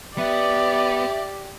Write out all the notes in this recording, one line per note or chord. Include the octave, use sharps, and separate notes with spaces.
B3 G4 D5 E5